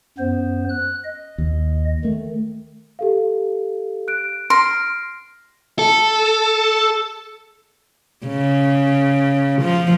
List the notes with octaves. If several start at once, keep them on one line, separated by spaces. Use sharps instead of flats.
F#2 B3 C5
F#6
D#5
D#2
D#3 A3
G4 A4 F5
F#6 D7
C6 F6 A#6 D7
A4
C#3
F3